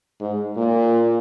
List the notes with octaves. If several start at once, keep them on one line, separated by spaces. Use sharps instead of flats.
G#2
A#2